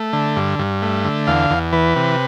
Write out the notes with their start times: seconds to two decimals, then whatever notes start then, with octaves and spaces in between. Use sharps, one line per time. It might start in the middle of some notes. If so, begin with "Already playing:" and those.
Already playing: A3
0.13 D3
0.36 G2
0.59 G2
0.82 A3
1.05 D3
1.27 E2 F5
1.50 E2
1.72 E3 B4
1.96 C3